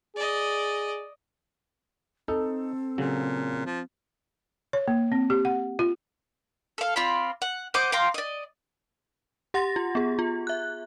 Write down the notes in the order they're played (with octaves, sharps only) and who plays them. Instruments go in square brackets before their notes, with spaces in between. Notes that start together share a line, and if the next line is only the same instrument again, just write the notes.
[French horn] G#4 [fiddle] D5 D#5
[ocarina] C4 [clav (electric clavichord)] D#4 [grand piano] A4
[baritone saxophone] A#2 [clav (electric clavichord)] C#3 F#3
[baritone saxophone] F3
[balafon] C#5
A#3
C4
G4
F#5
F4
[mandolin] A4 F5
C4 F4 D5 B5
F#5
C5 D#5 F#5 D6
F5 G5 A#5 C6
D5 D#5
[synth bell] G4 F#5 C6 A6 A#6
F4
B3 G#4
F4
E5 F#6